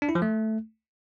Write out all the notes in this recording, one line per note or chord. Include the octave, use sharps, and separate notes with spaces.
D4
E4
F3
A3